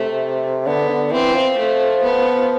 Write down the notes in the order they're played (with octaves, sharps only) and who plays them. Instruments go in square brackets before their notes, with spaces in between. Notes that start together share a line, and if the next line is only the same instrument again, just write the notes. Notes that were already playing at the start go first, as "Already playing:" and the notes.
Already playing: [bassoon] C3 [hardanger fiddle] A3
[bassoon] D3 [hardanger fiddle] B3
[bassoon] D3
[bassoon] E3 [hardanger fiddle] C4
[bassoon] F3
[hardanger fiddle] A3
B3